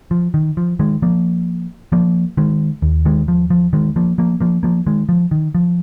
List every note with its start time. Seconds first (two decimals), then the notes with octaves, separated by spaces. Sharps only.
0.11 F3
0.34 D#3
0.57 F3
0.79 D#3 G#3
1.02 F3 A#3
1.92 F3 A#3
2.37 D#3 G#3
2.82 D#2
3.05 D#3 G#3
3.28 F3
3.50 F3
3.73 D#3 G#3
3.96 F3 A#3
4.18 F3 A#3
4.40 F3 A#3
4.63 F3 A#3
4.87 D#3 G#3
5.09 F3
5.31 D#3
5.55 F3